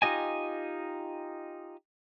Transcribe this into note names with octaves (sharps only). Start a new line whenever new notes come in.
D#4 F4 G4 D#5 G#5